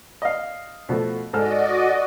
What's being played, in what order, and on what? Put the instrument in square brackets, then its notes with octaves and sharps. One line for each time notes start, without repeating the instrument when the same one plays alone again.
[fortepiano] D#5 F5
B2 F3 A3
[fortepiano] G#2 A4 F6 [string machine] F#4 D5 D#5